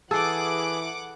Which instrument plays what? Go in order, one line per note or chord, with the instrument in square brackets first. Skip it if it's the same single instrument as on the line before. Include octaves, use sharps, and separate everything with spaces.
[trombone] E3 [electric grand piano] G#4 [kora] A4 [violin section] F#5 D6